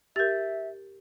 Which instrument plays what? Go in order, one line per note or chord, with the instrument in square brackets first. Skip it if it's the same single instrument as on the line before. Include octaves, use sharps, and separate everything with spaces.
[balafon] G4 A#4 [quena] E5 [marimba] G6 A6